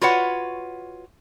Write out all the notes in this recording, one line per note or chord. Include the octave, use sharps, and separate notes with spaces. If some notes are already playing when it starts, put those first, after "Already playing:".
F4 F#4 B4 C#5 F#5